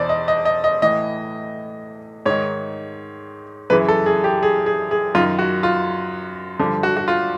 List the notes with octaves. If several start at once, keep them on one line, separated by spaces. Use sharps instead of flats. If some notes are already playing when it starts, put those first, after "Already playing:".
Already playing: E2 B2 C5 D5
D#5
D#5
D#5
D#5
A2 E3 D#5
G#2 D#3 C#5
F#2 C#3 E3 B4
A4
G#4
G4
G#4
G#4
G#4
F#2 D#3 F4
F#4
F4
G2 D3 F3
F#4
F#4
F4